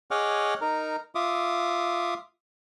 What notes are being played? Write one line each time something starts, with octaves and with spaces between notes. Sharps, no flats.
G#4 C#5 D#5 F#5 D6 F6
D#4 A#4
F4 E5 D6 D#6